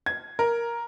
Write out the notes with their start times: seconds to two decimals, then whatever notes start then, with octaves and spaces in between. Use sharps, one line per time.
0.06 G#6
0.39 A#4